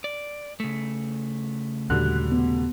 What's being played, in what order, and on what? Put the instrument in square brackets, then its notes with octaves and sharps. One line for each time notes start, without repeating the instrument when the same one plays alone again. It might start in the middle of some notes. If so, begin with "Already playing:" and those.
[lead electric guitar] D5
C#3 A3
[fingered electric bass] D#2 A#2 D4 [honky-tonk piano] D3 F#3 G3 [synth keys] F#6
[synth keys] B3